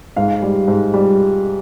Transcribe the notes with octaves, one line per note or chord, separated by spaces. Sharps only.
G#2 F5
G3
G#2
G3